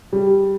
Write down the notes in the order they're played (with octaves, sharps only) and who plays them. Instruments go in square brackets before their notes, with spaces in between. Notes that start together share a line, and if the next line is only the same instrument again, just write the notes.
[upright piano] G3